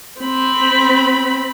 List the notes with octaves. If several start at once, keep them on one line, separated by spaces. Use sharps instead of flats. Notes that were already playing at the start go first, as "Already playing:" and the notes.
C4 B5